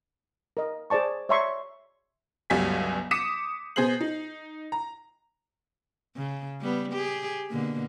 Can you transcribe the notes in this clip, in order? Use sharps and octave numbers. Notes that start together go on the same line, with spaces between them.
A#4 D#5
G#4 C5 D5 A5 C#6
C#5 D5 E5 A#5 C6 C#6
G1 C#2 F#3 G3 G#5 B6
D6 D#6 B6 C#7 D#7 E7
B2 G#4 C5 G6 C7 F#7
D#4
A#5
C#3
G3 B3
G4 G#4
B2 D3 A#3